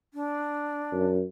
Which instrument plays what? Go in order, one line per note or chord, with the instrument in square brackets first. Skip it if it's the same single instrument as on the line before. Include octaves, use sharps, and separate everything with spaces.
[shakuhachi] D4
[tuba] F#2